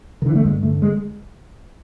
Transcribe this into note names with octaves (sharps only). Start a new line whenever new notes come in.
D#3
D3 E3
A3
G2 G#3
D3 A3
G#3